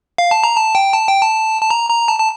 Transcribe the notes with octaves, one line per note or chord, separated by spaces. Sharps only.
F5
A5
A#5
A5
G5
A5
G5
A5
A5
A#5
A#5
A5
A5